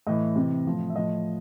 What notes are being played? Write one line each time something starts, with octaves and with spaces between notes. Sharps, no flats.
A2 E3 D#5
C3 E3
A2 F3
E5
A2 F3 D#5